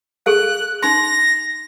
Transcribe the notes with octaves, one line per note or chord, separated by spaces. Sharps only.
G#4 A4 F5 F#6
D#4 C6 A#6